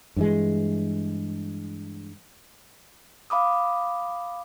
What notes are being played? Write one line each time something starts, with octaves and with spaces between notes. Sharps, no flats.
G2 E3 G#3
F5 B5 D6 D#6